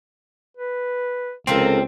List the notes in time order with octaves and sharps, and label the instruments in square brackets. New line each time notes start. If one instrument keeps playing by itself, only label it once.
[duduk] B4
[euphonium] C#2 [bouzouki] C3 F3 A4 [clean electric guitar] C4 [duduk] A#4